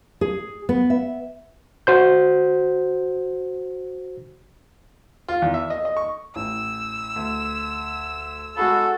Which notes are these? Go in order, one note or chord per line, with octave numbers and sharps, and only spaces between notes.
G#4
B3
E5
F#4 C5 G6
F4
E2
E5
D#5
D#5
C#6
A1 E6
D2
G#3 F#4 G#4 A4 B5